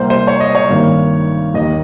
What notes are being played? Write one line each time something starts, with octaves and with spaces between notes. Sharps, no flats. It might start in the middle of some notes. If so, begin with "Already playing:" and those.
Already playing: C2 C3 G3 A#3 C5
C5
C#5
D#5
C#5
G#1 G2 D#3 A#3
D#2 D#3 A#3 D#5